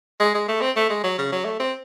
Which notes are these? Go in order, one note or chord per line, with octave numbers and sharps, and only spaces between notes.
G#3
G#3
A3
C4
A3
G#3
F#3
C#3
F#3
A3
C4